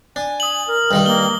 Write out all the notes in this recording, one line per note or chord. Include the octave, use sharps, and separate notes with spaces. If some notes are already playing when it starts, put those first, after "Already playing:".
D4 G#5
D#6 F#7
A#4
G2 D#3 G3
A#3 G7